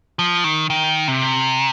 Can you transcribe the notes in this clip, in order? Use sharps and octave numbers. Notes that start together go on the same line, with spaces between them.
F3
D#3
D#3
C3